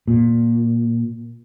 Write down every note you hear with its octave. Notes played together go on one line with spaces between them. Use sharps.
A#2